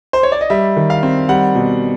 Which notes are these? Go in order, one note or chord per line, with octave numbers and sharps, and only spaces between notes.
C5
C#5
D5
D#5
G3 E5
D#3
F5
C4
G3 F#5
B2